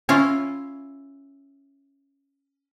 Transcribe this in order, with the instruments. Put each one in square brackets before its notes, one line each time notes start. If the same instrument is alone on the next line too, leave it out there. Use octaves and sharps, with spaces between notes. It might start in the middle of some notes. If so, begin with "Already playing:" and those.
[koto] C#4 E4 F4